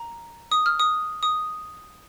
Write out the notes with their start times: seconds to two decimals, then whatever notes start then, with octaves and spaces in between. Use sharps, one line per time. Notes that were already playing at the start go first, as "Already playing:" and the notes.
Already playing: A#5
0.52 D#6
0.66 F6
0.79 D#6
1.23 D#6